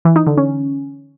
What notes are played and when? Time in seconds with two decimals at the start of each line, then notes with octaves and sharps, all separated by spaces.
0.05 E3
0.16 D#4
0.27 D3
0.37 C#4